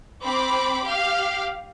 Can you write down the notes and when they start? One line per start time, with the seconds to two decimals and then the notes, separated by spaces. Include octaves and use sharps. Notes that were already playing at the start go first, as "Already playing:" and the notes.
0.23 C4 B5 D6
0.84 G4 F5